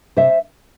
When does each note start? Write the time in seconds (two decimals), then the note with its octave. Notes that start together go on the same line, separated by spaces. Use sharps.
0.17 C3 C5 E5